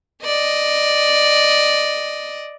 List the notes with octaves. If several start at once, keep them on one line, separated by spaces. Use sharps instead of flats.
D5 D#5